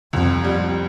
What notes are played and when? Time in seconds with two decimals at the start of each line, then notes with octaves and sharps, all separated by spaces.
0.13 C2 F2
0.44 G3